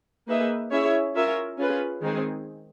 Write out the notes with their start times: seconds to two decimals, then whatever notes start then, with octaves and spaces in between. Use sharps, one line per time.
0.27 A#3 D#4 G#4 B4 E5
0.71 C#4 E4 G#4 C#5 E5
1.14 C#4 F4 A#4 C#5 E5
1.58 C#4 F4 G#4 B4
2.01 D#3 G#3 C4 D#4 G#4